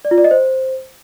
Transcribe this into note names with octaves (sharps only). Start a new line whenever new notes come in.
D5
F4
D5
D#5
C5